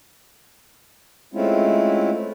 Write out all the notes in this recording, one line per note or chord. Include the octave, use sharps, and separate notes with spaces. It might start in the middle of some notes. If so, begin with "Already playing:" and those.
G#3 A3 C4 C#4 E4 F4